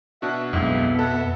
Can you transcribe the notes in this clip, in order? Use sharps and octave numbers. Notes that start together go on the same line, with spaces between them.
B2 D4 F#4 E5 F#5
B1 F2 G#2 B2 B3 E4
F#4 A4 E5 F#5